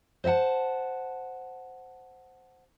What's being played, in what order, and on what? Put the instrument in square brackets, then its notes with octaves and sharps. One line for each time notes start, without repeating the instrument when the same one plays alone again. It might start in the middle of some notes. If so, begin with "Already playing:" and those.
[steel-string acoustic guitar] C5 D#5 E5 F#5 A5